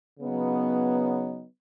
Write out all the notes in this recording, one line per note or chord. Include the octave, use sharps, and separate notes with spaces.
C#3 F#3 B3 D#4